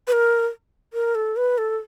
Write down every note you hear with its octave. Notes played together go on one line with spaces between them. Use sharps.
B4
A#4
A#4
A4
B4
A4